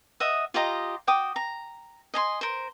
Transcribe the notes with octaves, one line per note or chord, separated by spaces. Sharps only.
D#5 E5 F#5 D#6
F4 G4 D#5 A#5
F#4 G5 D6 D#6
A#5
D#5 G#5 C6
A#4 C5